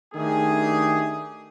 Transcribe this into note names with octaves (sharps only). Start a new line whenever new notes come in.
D#3 A3 D4 G4 G#4